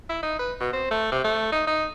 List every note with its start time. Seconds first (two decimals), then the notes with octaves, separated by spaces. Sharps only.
0.10 E4
0.23 D#4
0.39 B4
0.60 B2
0.73 C4
0.91 A3
1.12 C3
1.24 A3
1.52 D#4
1.67 D#4